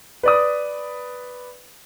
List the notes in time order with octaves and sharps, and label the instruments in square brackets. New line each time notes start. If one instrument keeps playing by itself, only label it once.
[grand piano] B4 D5 D#6